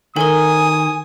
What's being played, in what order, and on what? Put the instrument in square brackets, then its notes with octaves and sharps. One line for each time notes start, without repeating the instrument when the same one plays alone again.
[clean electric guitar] D#3 [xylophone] A4 A#4 [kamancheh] G#5 [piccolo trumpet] D#6